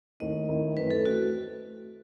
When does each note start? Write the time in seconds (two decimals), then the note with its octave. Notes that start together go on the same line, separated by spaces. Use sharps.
0.20 D#2 D#3 A3 C4 E4 D#5
0.48 D#2 D#3 A3 C4 E4
0.77 F#2 E3 A3 C4 B4
0.90 A4
1.05 A3 C4 F#4